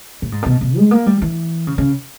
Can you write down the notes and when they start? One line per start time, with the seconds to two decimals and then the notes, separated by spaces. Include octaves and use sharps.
0.22 A#2
0.32 G#2
0.42 A#2
0.46 B2
0.61 B2
0.77 G#3
0.91 A#3
1.06 G3
1.22 E3
1.67 C#3
1.78 C#3